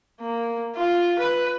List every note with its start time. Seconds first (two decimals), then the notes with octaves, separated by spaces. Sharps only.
0.20 A#3
0.76 F4
1.19 B4